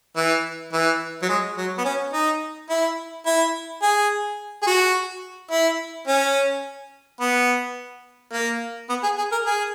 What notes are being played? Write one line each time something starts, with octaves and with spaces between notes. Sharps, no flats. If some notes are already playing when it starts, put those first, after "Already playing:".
E3
E3
F#3
G#3
F#3
B3
C#4
D#4
E4
E4
G#4
G#4
F#4
E4
C#4
B3
A#3
B3
G#4
G#4
A#4
G#4